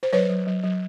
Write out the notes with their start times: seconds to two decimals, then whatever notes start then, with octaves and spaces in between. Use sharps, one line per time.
0.03 C5
0.13 F#3 B4 C#5
0.30 F#3
0.47 F#3
0.64 F#3